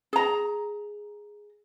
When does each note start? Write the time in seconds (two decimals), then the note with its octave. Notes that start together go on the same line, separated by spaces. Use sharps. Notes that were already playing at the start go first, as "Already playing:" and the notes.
0.13 G#4 A#5